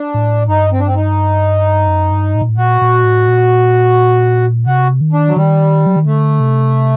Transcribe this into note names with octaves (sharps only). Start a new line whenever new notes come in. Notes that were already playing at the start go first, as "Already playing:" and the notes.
Already playing: D4
A2
G2 D#4
C4
D4
C4
D#4
F#2
G2
A2
A#2
A2
A#2 F#4
A#2
A2
A#2
C3 F#4
D#3
D4
F#3
D#3 G3
F#3
D#3
D3 A3
C3